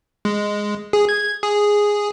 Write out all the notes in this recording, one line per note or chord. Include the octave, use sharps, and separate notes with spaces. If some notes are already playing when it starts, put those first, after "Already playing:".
G#3
G#4
G#6
G#4